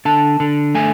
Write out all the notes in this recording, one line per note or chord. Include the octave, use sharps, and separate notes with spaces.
D3 A5
D3
A3 G#5